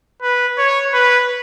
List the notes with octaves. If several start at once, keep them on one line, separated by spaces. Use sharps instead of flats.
B4
C#5
B4